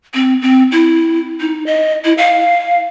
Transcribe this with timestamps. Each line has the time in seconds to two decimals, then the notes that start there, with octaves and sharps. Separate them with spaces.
0.14 C4
0.42 C4
0.72 E4
1.40 D#4
1.66 D#5
2.05 E4
2.18 F5